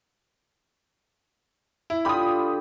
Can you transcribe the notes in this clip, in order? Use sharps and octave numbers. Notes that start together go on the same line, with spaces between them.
E4
D3 F4 G4 B5 D#6